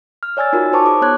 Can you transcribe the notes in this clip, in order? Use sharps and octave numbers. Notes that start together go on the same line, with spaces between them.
F6
C#5 D5 G#5 E6 A6
D#4 F4 F#4 A#4
D#4 A#4 C5 A5 C#6 D6
G#4 D6 D#6
B3 C#5 F#6 G#6